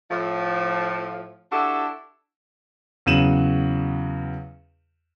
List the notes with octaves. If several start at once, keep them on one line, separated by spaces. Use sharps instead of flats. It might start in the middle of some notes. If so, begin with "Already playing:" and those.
A2 F3
D4 E4 F#4 G4 A4
E2 C#3 F#3 D#7 E7 F#7